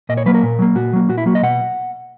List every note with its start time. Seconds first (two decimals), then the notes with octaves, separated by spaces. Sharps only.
0.09 A#2 D#5
0.17 C#5
0.26 F#3 A#3 B4
0.34 A#4
0.43 A#2
0.59 F#3 A#3
0.75 A#2 F#4
0.93 F#3 A#3
1.09 A#2 F#4
1.18 E4
1.26 F#3 A#3 F#4
1.35 D#5
1.42 B2 F#5